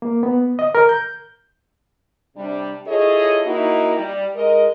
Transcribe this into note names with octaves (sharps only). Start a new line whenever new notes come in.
A#3
B3
D#5
A#4
G6
C3 G3 D4
E4 F4 G#4 A4 C#5 D#5
A#3 D#4 E4 F#4
G3
G#3 A#4 D#5